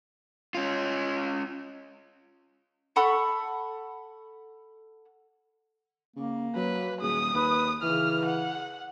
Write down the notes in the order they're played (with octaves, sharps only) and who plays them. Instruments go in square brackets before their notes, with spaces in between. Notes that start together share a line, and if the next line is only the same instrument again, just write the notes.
[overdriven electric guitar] C#4 F4
[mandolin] A4 F#5 B5 C#6
[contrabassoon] C#3 [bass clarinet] A#3
[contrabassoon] F#3 [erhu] B4
[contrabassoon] D#1 [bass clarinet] G#4 [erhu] D#6
[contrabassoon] D#2 [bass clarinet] B4
[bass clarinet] C#3 [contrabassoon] E3 [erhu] F6
[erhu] F#5